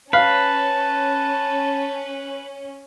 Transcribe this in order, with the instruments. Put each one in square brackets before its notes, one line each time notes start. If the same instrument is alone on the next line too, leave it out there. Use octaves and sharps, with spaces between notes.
[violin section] C#4 [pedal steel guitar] B4 [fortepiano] F5 [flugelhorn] A5